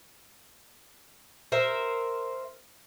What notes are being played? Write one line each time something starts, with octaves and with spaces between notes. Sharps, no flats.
A#4 C5 E5